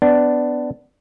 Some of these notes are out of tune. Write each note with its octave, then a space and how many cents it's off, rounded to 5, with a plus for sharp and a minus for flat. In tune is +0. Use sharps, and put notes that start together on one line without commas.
B3 +20 D4 +0